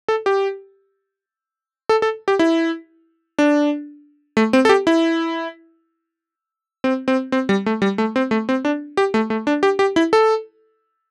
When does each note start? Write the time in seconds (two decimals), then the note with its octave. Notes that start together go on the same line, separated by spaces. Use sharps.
0.08 A4
0.26 G4
1.89 A4
2.02 A4
2.28 G4
2.39 E4
3.39 D4
4.37 A3
4.53 C4
4.65 A4
4.69 G4
4.87 E4
6.84 C4
7.08 C4
7.32 C4
7.49 G3
7.66 A3
7.82 G3
7.98 A3
8.16 C4
8.31 A3
8.49 C4
8.65 D4
8.97 G4
9.14 A3
9.30 A3
9.47 D4
9.63 G4
9.79 G4
9.96 E4
10.13 A4